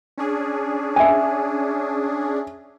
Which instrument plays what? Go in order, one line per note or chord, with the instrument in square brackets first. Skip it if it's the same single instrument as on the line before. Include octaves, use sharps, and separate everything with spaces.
[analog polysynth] C#4 D4 G#4
[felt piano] E5 G#5